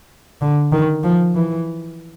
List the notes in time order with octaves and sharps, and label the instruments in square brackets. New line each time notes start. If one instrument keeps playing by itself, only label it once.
[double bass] D3
D#3
F3
E3